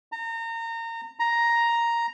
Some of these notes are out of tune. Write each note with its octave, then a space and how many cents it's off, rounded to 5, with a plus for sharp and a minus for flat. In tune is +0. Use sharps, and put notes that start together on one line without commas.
A#5 -30
A#5 +5